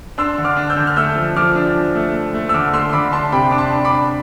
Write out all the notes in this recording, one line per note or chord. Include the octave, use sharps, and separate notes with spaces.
D4 C6 E6
D3
D6 F6
D4
E6 G6
D3
F6
A3 E6 G6
F3
F3 D6 F6
D4
F3
A3
A3
A3
E6
D3 D6 F6
A3 C6 E6
C6
D3 B5 D6
D4 A5 C6
C3 G5 B5
D4 D6
A5 C6
D4
B5 D6
D4